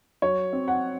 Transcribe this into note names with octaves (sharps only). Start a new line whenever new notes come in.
F#3 C#5
C4
F#5